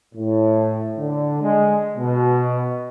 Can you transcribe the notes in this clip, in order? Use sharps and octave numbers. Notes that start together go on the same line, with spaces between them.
A2
D3
G#3
B2